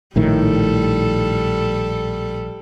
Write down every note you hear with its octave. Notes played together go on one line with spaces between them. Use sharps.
A#1 A2 D#3 G3 A4